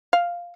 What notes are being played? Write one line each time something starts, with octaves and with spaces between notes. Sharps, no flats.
F5